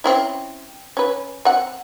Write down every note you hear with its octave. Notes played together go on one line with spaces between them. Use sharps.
C4 C#4 E4
C#4 B4
C4 F#5